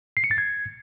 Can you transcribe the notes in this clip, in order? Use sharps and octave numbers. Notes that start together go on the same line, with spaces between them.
C7
C#7
A6
G#6